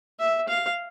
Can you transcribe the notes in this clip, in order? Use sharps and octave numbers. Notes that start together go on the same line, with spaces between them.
E5
F5